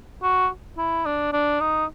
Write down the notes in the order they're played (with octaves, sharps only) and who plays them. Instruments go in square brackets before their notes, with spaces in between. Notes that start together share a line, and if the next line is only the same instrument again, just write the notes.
[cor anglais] F#4
E4
D4
D4
D#4